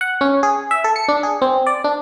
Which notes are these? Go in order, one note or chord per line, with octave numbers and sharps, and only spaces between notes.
F#5
C#4
G#4
E5
A4
C#7
D4
G#4
C4
D5
D4